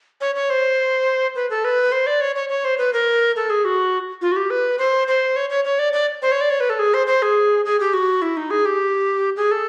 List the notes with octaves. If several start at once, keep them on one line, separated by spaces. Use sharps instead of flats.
C#5
C#5
C5
B4
A4
B4
C5
D5
C#5
C#5
C#5
C5
B4
A#4
A4
G#4
F#4
F4
F#4
G4
B4
C5
C5
C#5
C#5
C#5
D5
D5
C5
C#5
D5
C#5
B4
A4
G#4
C5
C5
G#4
G#4
G4
F#4
E4
D#4
G#4
G4
G#4
A4